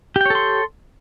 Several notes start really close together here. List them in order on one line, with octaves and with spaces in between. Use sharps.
G4 G5 C#5 A4 C6